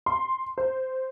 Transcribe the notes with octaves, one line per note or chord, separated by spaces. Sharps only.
C6
C5